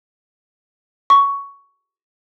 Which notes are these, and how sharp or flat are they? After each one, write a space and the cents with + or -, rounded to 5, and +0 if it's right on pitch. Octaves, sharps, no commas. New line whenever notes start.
C#6 +10